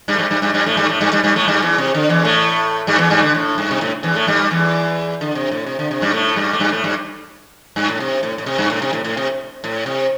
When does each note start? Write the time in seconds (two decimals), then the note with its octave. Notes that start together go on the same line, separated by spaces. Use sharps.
0.08 G2 G3
0.15 A3
0.19 G2 G3
0.31 G2 G3
0.42 G2 G3
0.54 G2 G3
0.66 A2 A3
0.77 G2 G3
0.89 A2 A3
1.00 G2 G3
1.13 G2 G3
1.24 G2 G3
1.36 A2 A3
1.48 G2 G3
1.62 E2 E3
1.78 C3
1.95 D3
2.09 E2 E3
2.24 A2 A3
2.87 G2 G3
2.98 E2 E3
3.10 G2 G3
3.22 D3
3.35 A2
3.58 G2
3.71 C3
3.81 A2
4.03 E2 E3
4.15 A2 A3
4.27 G2 G3
4.51 E2 E3
5.21 D3
5.35 C3
5.52 A2
5.66 C3
5.79 D3
5.91 C3
6.02 G2 G3
6.13 A2 A3
6.36 G2 G3
6.53 A3
6.60 G2 G3
6.72 A2 A3
6.84 G2 G3
7.76 G2
7.88 A2
8.00 C3
8.23 A2
8.38 A2
8.46 C3
8.58 G2
8.70 A2
8.82 C3
8.93 A2
9.04 A2
9.17 C3
9.64 A2
9.86 C3